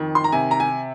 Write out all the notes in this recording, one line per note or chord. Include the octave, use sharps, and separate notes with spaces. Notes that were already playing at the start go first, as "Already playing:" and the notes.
Already playing: F2 D#3
C6
A#5
C3 G#5
A#5
G#5